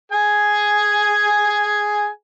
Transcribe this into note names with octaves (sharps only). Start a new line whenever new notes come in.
G#4 G#5